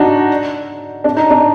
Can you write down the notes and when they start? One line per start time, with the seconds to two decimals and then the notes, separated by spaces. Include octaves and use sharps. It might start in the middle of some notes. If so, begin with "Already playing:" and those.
Already playing: D4 D#4 F#4
1.04 D4
1.17 D#4
1.30 D4